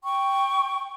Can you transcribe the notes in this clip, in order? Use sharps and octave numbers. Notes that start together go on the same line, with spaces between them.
G5 C#6